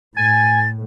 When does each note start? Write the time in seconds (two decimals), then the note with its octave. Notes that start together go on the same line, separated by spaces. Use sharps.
0.17 A2 G#5 A6